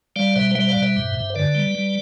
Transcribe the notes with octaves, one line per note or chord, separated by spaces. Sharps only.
G3 D5 F5
B2 C5 E5
G3 C5 E5
D5 F5
B2
C5 E5
G2
G2
D3 B4 D5
G3
G3